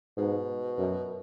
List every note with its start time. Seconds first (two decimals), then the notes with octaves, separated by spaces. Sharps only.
0.17 G#2 B2
0.78 F#2